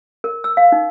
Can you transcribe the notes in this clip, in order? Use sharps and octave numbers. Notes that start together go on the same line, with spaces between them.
A#4
E6
F5
D#4